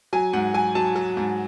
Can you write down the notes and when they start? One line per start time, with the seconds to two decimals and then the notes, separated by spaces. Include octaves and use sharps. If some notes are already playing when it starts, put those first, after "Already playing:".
0.13 F#3 G#5
0.33 G#2 F#5
0.54 F#3 G#5
0.75 F#3 A5
0.96 F#3
1.17 G#2